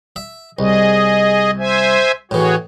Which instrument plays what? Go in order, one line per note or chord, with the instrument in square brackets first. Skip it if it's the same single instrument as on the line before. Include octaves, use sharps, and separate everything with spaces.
[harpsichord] E5
[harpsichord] C2 [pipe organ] G#4 D#5
[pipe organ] C5 E5 G#5
[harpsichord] A2 E3 [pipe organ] F#4 G#4 C#5